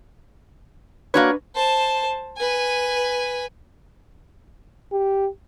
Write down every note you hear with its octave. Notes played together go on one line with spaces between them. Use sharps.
A#3 D4 F#4 B4 C#5
C5 A5
B4 G#5
G4